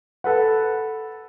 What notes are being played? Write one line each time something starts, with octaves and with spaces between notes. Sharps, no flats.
A4 B4 F#5